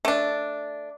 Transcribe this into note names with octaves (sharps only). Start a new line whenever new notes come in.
A3 D4